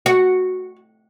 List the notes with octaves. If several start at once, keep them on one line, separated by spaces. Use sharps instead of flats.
F#4